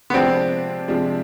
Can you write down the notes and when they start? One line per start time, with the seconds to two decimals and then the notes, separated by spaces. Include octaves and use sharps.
0.10 B3
0.14 C3 F3 G#3 C4 D4
0.88 C3 F3 G#3 D4